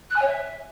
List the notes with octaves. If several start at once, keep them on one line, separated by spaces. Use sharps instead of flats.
F#6
G#5
C#5
E5